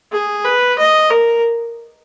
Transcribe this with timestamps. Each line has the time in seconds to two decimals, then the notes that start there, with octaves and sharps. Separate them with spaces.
0.12 G#4
0.45 B4
0.78 D#5
1.11 A#4